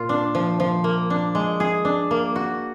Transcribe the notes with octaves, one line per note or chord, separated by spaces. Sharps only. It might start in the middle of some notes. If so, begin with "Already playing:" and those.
Already playing: A#2 F4
D4
F3
F3
A#3
D4
G#3
G#4
D4
A#3
F#4